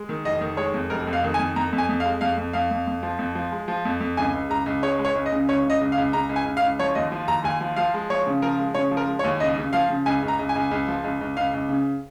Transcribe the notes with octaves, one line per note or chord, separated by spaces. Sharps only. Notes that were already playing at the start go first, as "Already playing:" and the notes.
Already playing: G#3
D#3
F1 D#5
D#3
G#3 C#5
F2
F1 A#4
F2
F5
D#3
G#5
F2
F2 A#5
F2
G#5
F2
F5
G#3
F2 F5
F2
F2 F5
F2
F2
F3
F2
F3
G#3
F3
F2
F2
C#2 G#5
C#2
C#2 A#5
C#2
G#3 C#5
G#3
C#5
C#2
D#5
C#3
C#2 C#5
C#3 D#5
C#2
F5
C#2
C#2 A#5
C#2
G#5
C#2
F5
C#2
F3 C#5
D#2 D#5
F3
D#2 A#5
D#2 G#5
F3
F3 F5
G#3
F3 C#5
C#3
F3 A#4
G#3
C#3 C#5
F3
A#4
G#3
C#5
D#2
C#2 D#5
C#3
F3 F5
C#3
C#2 G#5
C#2
A#5
C#2
G#5
C#2
C#2
F3
C#2
C#2
C#2 F5
C#2
C#3